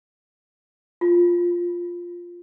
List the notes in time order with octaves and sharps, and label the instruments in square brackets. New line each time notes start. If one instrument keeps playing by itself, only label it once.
[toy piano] F4